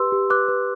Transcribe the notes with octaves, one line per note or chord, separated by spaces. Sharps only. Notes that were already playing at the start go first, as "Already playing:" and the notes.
Already playing: G4 B4 C6 E6
G4
B4 D6 F#6
B4